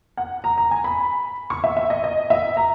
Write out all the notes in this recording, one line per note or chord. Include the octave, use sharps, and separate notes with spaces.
F#5
A#5
A#5
G#5
B5
C#6
E5
E5
D#5
D#5
E5
A#5